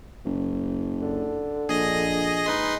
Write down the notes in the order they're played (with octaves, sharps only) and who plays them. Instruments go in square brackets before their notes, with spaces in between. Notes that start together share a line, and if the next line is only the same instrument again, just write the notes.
[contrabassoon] F#1
[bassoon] D3
[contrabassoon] A#1 [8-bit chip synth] G#4 D#5 A#6
[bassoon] G#3 [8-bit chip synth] D#4 B4 C6